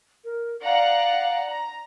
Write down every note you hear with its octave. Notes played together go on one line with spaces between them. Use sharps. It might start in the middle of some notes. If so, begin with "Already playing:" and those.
A#4
D5 F5 F#5 A#5
A#5